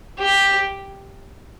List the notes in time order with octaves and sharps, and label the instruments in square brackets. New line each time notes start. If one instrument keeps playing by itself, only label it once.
[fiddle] G4